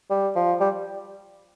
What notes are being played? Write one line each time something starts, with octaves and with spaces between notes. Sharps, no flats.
G3
F3
G3